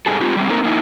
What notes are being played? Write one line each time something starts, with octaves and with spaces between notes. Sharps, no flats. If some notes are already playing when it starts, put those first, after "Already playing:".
G#2 G3 G#4 A4
G#3 C4 F4 G4
G3 G#3 C4
A3 A#3 C4 D#4 A#4
A#3 D#4 E4